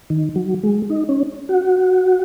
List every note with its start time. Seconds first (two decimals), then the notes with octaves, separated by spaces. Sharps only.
0.10 D#3
0.36 F#3
0.63 G#3
0.90 D#4
1.09 C#4
1.49 F#4